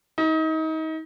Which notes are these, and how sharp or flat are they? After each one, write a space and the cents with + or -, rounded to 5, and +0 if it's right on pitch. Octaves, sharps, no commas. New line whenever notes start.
D#4 +30